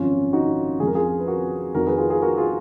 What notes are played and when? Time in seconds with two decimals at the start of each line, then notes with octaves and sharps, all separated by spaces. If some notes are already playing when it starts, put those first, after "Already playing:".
Already playing: G#1 F#2 F3 C#4 F4
0.33 D#4 F#4
0.80 F2 G#4
0.83 F3 A#4
0.95 F4 G#4
1.19 B4
1.27 F#4 A#4
1.74 F1 F2 D#3 F#4 A#4
1.86 G#4 B4
1.97 F4 G#4
2.10 F4 G#4
2.22 F#4 A#4
2.38 F4 G#4